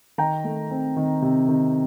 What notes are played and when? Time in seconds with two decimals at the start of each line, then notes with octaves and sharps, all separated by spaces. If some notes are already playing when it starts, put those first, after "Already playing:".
0.18 D#3 G5 A#5
0.44 A3
0.70 C4
0.96 D#3
1.22 C3
1.48 D#3